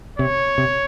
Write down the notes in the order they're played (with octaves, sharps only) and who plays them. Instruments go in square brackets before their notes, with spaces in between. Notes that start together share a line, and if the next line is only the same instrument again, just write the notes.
[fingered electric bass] C3 [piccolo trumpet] C#5
[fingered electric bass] C3